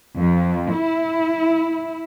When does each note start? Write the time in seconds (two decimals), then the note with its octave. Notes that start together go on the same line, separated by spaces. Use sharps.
0.17 F2
0.74 E4